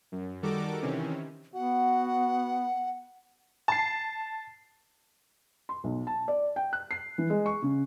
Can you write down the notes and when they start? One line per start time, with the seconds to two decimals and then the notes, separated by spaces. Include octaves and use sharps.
0.12 F#2
0.42 D#3 G3 F#4 A4 A#4 D6
0.82 C3 D#3 E3 C4 C#4
1.54 B3 F#4 F#5
3.68 A5 C7
5.69 C6
5.84 B1
6.07 A5
6.28 D5
6.56 G5
6.73 F#6
6.91 C7
7.18 E3
7.30 G#3
7.46 C#6
7.62 C#3